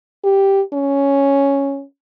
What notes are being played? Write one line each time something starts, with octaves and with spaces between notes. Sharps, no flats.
G4
C#4